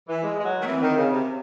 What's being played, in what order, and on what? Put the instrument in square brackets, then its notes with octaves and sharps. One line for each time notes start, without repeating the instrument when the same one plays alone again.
[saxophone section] E3
G#3
G#3
F#3
D#3
[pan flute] A3
[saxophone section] E3 [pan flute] C4
[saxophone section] D#3
C#3
C3